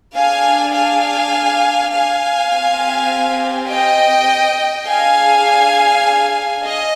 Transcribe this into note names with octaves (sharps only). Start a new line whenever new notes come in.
D4 G#4 F5 G#5
F5 G#5
F5 G#5
C4 G4
D#5 G5
D4 G#4 F5 G#5
D#5